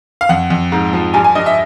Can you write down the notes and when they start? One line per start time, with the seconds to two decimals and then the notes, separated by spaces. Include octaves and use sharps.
0.21 F5
0.29 F2 F#5
0.50 F2
0.72 G#2
0.93 F3
1.14 G2 G#5
1.24 G#5
1.35 G2 D#5
1.46 E5